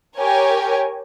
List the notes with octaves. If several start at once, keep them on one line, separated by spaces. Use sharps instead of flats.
G4 A#4 C#5 G#5